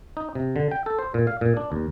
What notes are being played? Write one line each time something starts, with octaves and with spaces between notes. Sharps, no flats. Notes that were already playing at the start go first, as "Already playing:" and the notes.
D#4
C3
D3
G5
A4
C5
A#2
F5
A#2
D4
D#2